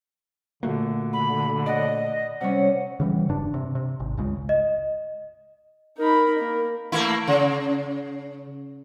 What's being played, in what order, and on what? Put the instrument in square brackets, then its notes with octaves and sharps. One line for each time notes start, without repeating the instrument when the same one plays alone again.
[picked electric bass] A#2 A3 A#3 [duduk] D3 [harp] F#4
[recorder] B5
[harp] D5 F#5 [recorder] D#5
[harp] C3 G3 C#4 [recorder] F#5
[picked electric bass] C#3 E3 G3
E1 G2 D4
C3
C3
G#1
G1 C#2 C#3 G#3
[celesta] D#5
[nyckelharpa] D#4 B5 [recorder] A#4
[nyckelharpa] A#3
[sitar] A3 A#3 E4
C#3